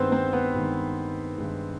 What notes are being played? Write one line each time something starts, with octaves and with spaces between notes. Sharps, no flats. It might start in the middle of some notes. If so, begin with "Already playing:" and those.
Already playing: G2 D#3 G#3 B3 C4 B4 C5
C4 C5
B3 B4
G2 D#3 G#3
G2 D#3 G#3